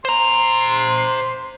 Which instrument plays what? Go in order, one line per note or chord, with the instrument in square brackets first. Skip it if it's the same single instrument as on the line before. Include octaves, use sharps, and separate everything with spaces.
[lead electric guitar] C5 A#5 [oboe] C6